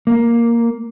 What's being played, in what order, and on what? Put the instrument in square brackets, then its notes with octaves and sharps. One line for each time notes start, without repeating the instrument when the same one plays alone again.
[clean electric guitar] A#3